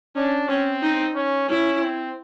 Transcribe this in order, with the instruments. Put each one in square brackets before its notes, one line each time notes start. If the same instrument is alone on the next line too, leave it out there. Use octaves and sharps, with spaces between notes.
[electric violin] C#4 [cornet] D4
[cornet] C4 [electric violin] C#4
[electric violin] D#4
[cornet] C#4
[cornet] C#4 [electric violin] E4
[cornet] C4